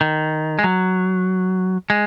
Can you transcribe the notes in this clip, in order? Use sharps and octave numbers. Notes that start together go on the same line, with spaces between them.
D#3
G#3
F#3
G#3